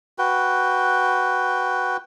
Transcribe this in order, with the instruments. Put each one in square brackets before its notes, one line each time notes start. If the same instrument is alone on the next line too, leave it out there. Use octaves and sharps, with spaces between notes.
[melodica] F#4 B4 G5